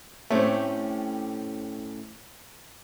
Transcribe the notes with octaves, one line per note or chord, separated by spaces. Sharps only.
A2 A3 C4 C#4 G4